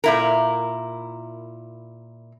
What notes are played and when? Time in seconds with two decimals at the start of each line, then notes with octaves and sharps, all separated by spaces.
0.04 A#2 E4 A#4